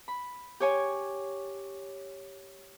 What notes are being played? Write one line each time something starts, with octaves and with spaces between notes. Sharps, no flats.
B5
G4 C#5 G#5